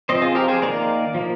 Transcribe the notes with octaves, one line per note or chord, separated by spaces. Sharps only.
F3 C4 C5 D#5
F4 G#4
G4 A#4
G#4 C5
D#3 A#3 A#4 D5
F3 A#3